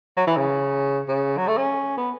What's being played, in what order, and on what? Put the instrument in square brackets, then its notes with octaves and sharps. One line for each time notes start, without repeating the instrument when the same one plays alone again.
[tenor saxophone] F#3
E3
C#3
C#3
F#3
A3
C#4
B3